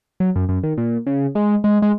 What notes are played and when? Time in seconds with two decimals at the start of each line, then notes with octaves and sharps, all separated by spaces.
0.20 F#3
0.36 F#2
0.49 F#2
0.63 D#3
0.78 A#2
1.07 C#3
1.35 G#3
1.64 G#3
1.82 G#3